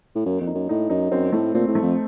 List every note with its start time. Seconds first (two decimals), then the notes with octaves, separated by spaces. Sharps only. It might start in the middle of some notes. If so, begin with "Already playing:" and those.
0.15 A2
0.26 F#2 A#3
0.41 F2
0.47 D#4
0.55 F#2
0.69 A2 D#4
0.90 F#2 D#4
1.11 F#2 C4
1.32 A2 A3
1.54 A#2 C4
1.68 A2
1.75 A3
1.82 F2